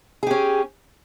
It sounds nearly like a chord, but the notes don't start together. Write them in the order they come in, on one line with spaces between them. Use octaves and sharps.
G#4 G4 C#4